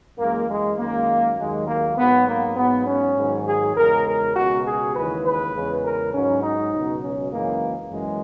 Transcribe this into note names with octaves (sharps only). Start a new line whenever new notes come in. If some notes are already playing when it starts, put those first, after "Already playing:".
F#2 E3 G#3 A#3
G#3
F#2 D#3 G#3 A#3
D#2 D#3 F#3 G#3
A#3
G#2 F#3 B3
A#3
G#2 F#3 B3
C#4
G#2 D#3 F#3
G#4
E2 C#3 G#3 A#4
A#4
C#2 B2 G#3 F#4
G#4
D#2 C#3 E3 G#3 B4
B4
E2 C#3 G#3
A#4
G#2 F#3 C#4
D#4
C#2 B2 F#3
C#4
F#2 C#3 E3 G#3 A#3
F#2 E3 G#3